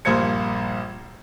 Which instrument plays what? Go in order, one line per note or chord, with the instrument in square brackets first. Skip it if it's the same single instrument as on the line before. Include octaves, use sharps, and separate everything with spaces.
[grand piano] A#1 G2 A#3 C5 G#6 C#7